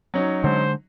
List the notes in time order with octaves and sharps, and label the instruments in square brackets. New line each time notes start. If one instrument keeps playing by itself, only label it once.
[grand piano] F#3 C#4 D#4
[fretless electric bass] D3 G#3 [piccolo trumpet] C5